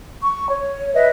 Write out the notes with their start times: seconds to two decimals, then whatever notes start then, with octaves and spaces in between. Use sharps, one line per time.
0.21 C#6
0.49 C#5
0.94 B4 D#5 E5